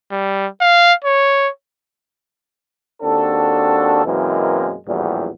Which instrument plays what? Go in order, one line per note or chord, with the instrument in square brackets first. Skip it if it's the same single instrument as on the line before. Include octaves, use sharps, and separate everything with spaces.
[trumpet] G3
F5
C#5
[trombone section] D#2 C4 D4 F#4 A4
F#2 B2 E3 G#3 A#3 C4
A#1 E2 A2 F#3 G3